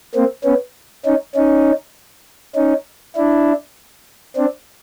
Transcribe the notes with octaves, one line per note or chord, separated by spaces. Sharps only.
A#3 C4
B3 C#4
C#4 D#4
C#4 D#4
C#4 D#4
D4 E4
C4 D4